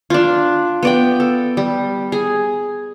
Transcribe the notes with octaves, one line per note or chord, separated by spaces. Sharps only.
D4 F4
B3 D5 G5
A4
G3
G#4